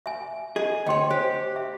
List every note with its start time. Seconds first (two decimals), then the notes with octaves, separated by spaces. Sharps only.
0.06 E5 G#5
0.56 G#4 D#5
0.86 D2 C#5 D#5 G5 C6
1.11 G4 C5
1.56 E5